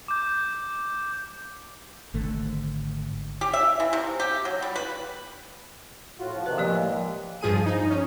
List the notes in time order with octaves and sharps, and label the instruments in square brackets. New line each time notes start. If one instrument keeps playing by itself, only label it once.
[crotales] D6 G6
[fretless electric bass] G#1 D3 A3
[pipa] G4
E5
E3
C3
G4
F#3
G3
B4
[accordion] A2 F4 F#4
F3
[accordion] C3 D#3 F#6 [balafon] B4
[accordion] A2 G#3 A#3 [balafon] F3 G4 D5
[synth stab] G2 F3 G#4 D#7
D#4
C#4